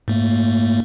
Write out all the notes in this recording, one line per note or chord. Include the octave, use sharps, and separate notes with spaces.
G#2 A3 A#3